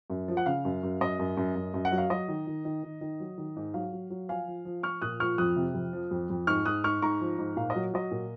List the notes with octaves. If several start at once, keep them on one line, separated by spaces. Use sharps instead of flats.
F#2
F3
F#5
C#3 F5
F#2
F#2
F#2 D#5
F#2
F#2
F#2
F#2
F#5
F#3
F5
F#3 D#5
D#3
D#3
D#3
D#3
D#3
F#3
D#3
G#2
F#3 F5
F#3
F#3
F3 F5 G#5
F3
F3
F3 C#6 F6
A#2 D#6 F#6
F3 C#6 F6
F2 D#6 F#6
C3
F2
F3
F2
F2
G#2 C#6 F6
G#2 D#6 F#6
G#2 C#6 F6
G#2 A#5 C#6
F3
G#2
A#2 F5
D#5
F#3
F#3 D#5
A#2